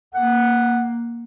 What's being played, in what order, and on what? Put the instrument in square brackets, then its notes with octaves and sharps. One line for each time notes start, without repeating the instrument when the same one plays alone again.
[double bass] A#3 [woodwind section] F#5